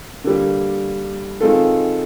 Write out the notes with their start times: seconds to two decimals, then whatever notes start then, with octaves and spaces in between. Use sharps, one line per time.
0.24 D3 G3 A#3
1.41 D#3 G#3 C4 F4 A4